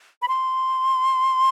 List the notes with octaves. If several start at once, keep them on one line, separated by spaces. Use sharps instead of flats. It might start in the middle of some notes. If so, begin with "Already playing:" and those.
B5
C6